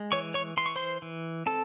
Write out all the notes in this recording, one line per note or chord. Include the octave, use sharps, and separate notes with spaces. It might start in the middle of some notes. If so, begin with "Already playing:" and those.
Already playing: G#3
E3 C#5 C#6
C#5 C#6
E3 C6
C#6
C5 C6
E3
C4 A4 A5